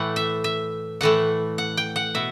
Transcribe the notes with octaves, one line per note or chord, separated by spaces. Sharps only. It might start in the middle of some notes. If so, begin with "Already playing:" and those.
Already playing: A2 E3 A3 F#5
E5
E5
A2 E3 A3 F#5
F#5
G5
F#5
B2 E5